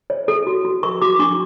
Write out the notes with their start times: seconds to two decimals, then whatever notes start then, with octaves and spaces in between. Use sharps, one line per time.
0.10 C#5
0.28 A4
0.47 F#4
0.65 F#4
0.83 A#4 C#6
1.02 F#4 D6
1.19 D4 C#6